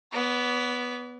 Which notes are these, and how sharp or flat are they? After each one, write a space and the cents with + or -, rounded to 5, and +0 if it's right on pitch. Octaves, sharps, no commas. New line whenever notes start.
B3 +0 D5 -45